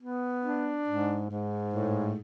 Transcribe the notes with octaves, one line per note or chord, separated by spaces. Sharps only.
B3
D4
G#2
G#2
A2